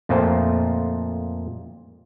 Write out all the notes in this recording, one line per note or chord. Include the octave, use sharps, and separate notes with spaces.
F2 A#2 A3 F4 C5